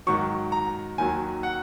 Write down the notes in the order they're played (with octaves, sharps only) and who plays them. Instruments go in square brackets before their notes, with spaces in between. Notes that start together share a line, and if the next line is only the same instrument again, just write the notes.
[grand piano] G#2 D#3 F#3 C#6
A#5
D#2 D#3 F#3 G#5
F#5